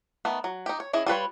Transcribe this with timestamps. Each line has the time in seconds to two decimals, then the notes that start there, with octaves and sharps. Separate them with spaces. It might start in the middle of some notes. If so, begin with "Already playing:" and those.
0.25 D#3 A3 B3
0.44 F#3
0.66 D#4 G4
0.80 C#5
0.93 C#4 E4 G#4 D#5
1.06 G3 F4 B4 C#5